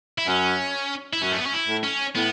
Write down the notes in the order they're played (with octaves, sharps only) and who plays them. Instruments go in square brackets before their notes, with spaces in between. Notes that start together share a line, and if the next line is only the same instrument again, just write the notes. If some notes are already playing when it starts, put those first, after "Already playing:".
[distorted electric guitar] E4
[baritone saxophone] F#2 [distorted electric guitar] C#4
[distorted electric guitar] E4
[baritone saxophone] F#2 [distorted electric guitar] C#4
[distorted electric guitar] A3
B3
C#4
E4
[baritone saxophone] A2
[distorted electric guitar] C#4
[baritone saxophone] A2 [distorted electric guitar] B3